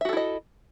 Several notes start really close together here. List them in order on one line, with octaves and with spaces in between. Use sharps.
E5 F#4 A4 E4 D#5